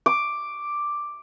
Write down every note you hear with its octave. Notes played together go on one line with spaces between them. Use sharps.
D6